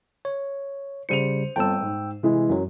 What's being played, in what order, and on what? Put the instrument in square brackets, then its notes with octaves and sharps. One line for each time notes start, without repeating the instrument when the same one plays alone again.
[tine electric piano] C#5
[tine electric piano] C#3 G3 C#7 [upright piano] C5 D#7 F7
[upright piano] G1 C4 A5 [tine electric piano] G5 E6
[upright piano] G#2
[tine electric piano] C3 [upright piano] E3 G#3 E4
[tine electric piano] F#2 F#3